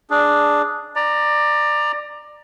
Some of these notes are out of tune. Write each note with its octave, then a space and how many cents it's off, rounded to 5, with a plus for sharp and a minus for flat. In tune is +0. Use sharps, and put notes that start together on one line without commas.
D4 +0 G#4 +0
D5 +20 A#5 +0